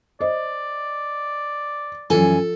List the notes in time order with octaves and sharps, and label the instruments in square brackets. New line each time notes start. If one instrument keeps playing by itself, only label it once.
[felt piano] C5 D#5 [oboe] D5
[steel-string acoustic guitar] F#2 E3 G#5 [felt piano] F3 [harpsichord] A4